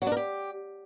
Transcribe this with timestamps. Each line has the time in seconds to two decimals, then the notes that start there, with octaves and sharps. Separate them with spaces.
0.02 F#3
0.07 D4
0.12 A#4
0.17 G4